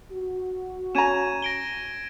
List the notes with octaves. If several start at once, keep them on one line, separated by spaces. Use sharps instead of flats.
F#4
C#4 A#5 G#6 D#7 E7
A#6 D7 G7